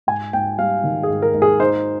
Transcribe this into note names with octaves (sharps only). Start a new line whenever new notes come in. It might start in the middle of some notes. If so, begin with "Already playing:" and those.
G#2 G#5
G#2 G5
G3 F5
D#3
G#4
G#2
A#4
G#2
G#4
D#4 C5